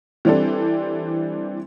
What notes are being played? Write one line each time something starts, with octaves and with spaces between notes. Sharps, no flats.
E3 G3 C4 D4 A4